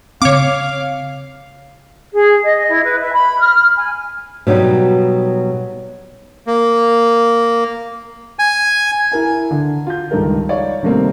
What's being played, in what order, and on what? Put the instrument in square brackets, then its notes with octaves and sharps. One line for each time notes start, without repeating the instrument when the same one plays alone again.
[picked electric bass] C#3 C4 [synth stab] C#5 D6 [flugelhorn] F5
[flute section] G#4
D#5
E4
B4
E5
B5
F6
G#5
[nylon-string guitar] B2 F#3 G3 D#4
[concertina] A#3
G#5
[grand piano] E4 A#4 G#5
D3
F4 G6
C#2 G2 D#3 A4 A#4
D#4 C#5 D5 F5
C3 D#3 G3 A3 A#3 C4